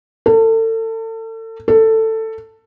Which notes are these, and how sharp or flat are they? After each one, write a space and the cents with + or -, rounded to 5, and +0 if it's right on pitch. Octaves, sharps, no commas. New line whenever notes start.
A4 +35
A4 +15